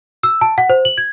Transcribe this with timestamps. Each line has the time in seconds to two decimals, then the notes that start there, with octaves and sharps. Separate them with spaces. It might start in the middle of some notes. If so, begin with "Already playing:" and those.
0.23 E6
0.41 A5
0.58 F#5
0.70 C5
0.85 F#7
0.98 G#6